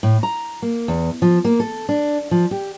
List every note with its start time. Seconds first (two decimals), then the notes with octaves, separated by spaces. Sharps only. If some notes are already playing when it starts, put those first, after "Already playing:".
0.03 A2
0.23 A#5
0.62 A#3
0.88 E2
1.22 F3
1.45 A#3
1.60 A4
1.89 D4
2.31 F3
2.51 G4